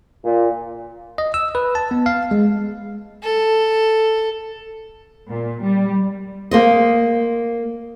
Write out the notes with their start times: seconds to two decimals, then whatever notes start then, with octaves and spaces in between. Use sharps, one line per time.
0.24 A#2
1.18 D#5
1.34 E6
1.55 B4
1.75 A5
1.91 B3
2.06 F5
2.31 G#3
3.23 A4
5.29 A#2
5.62 G3
6.51 A#3 C5 D#5